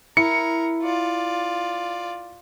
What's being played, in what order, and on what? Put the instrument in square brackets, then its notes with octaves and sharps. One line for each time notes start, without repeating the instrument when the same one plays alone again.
[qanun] E4 [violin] A#4 [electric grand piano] C#7
[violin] F4 D5